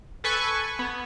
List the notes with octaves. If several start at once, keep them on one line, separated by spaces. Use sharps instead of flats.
A4 B4 G#5 C#6
B3